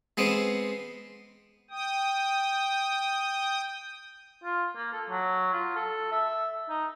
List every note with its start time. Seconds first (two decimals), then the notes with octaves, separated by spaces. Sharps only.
0.17 G#3 B3 C4
1.71 G5 D#6
4.44 F4
4.76 A#3
4.92 A4
5.09 F#3
5.53 F4
5.75 A4
6.11 E5
6.69 D#4